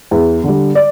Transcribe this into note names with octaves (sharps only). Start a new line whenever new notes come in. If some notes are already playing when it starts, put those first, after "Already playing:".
E2
D3 G3
D5